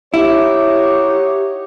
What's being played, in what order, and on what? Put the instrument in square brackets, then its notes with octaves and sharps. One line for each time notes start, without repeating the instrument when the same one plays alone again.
[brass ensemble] D#4 F#4 C#5 [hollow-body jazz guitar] E4 [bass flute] G4